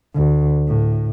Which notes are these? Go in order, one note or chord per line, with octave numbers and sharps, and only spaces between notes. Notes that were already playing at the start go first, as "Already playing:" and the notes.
D2
A2